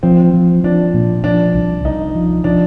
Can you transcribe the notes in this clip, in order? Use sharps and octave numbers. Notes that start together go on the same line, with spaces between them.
F3 C4
F3
F3 D4
A#2
F3 D4
C2
C2 D#4
F3
F3 D4